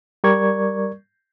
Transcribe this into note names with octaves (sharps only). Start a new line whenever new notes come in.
G3 A#4 D5 C#6 G#6